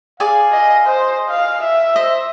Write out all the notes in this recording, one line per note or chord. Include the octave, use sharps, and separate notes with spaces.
G#4 D5 F5 G#5
D#5
C5 D#5
F5
E5
C5 D#5